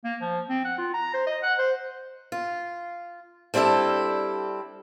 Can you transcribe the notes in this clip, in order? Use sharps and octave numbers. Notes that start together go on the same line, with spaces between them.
A#3
F3
C4
F#5
F4
A#5
C5
D#5
F#5
C5
F4
G3 C4 D4 E4 A4